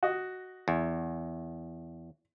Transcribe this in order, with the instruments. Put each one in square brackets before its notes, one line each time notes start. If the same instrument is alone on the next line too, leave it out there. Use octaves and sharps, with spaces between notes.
[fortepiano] F#4 D#5
[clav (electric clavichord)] E2